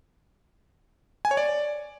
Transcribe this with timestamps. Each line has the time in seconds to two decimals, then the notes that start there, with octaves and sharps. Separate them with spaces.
1.25 G#5
1.31 C#5
1.37 D5